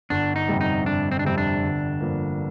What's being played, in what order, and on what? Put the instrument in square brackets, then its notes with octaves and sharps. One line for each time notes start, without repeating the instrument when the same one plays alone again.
[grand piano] G1 [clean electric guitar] D4
[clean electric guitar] D#4
[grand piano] F2 C3 G3
[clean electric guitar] D#4
[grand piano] G1 [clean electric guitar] D4
[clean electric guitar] C4
D4
[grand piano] F2 C3 G3 [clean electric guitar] C4
[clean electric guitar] D4
[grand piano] G1
G2 F3 A#3